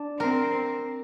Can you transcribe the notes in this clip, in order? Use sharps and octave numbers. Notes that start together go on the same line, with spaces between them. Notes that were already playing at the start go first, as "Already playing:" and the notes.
Already playing: D4
C4 A#4